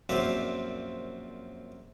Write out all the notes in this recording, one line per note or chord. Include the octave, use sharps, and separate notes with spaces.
A#1 F#2 C4 F4 D5 E5